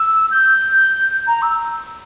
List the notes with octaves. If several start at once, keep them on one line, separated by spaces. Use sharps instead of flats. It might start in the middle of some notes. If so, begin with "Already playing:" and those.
Already playing: E6
G6
A#5
E6